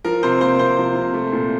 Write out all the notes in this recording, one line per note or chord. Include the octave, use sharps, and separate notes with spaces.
F3 A#4
C3 C5
A#3 C5
C3 C5
F3
C3
A3
A#2